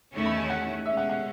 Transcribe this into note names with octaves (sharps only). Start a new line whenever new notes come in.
E2 D#3 A3 C#4 E4
B5
G#5
F#5
B2 G#3 C#4 E5
F#5
F#5